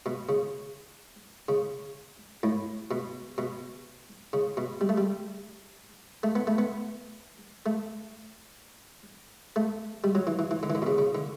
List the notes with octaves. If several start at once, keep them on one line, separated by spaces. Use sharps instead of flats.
B2
C#3
C#3
A2
B2
B2
C#3
B2
G3
A3
G3
A3
B3
A3
B3
A3
A3
G3
F#3
E3
E3
E3
D3
E3
D3
B2
C#3
C#3
D3